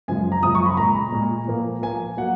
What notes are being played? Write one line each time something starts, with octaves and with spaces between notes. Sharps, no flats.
F#2 C#3 F3 G#3 G#5
A#5
F#2 C#3 F3 G#3 D#6
C#6
B5
A#2 G#3 A#5
A#2 G#3
A#2 F3 A#3
A#2 F3 A#3 G#5
F#3 A#3 F#5